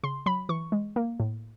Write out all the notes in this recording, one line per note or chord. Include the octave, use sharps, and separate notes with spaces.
C#3 C6
F#3 B5
E3 C#6
G#3
A#3
A2